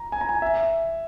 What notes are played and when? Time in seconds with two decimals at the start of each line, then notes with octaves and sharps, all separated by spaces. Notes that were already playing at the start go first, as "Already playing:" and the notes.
Already playing: A#5
0.12 G#5
0.21 A#5
0.29 G#5
0.42 E5